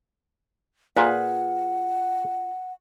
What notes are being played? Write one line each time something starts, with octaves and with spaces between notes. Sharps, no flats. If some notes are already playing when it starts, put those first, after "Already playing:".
A#2 F4 G#4 B4 F#5